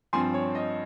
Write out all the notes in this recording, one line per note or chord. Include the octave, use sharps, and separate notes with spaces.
G2 F3 C4 G#5 C6
C#5
D#5